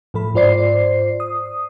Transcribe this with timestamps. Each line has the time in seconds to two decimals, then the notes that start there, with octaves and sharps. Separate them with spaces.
0.14 A2 F3 A4 B5
0.34 G#2 F4 C5 D5 C7
1.20 D#6